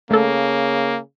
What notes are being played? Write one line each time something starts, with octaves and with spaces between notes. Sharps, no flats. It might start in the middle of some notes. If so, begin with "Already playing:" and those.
C#3 A3 A#3 A4